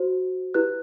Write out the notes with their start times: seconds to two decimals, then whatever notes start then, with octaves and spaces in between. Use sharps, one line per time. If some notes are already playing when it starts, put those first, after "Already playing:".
Already playing: F#4 C5
0.54 E4 G4 B4 F#6